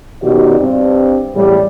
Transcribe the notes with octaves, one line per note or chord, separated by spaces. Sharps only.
F#2 B2 D#3 F#4 G4 D5
G2 C4
E2 A2 G3